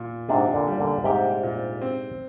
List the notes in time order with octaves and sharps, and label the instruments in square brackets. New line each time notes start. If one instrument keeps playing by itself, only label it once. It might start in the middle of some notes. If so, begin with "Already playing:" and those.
Already playing: [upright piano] A#2
[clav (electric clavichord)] G#2 C3 [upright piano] D4
[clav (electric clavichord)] A#2 D3
[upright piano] G3
[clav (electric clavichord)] A#2 D3
[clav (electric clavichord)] G#2 C3 [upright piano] G4
[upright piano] A#2
C4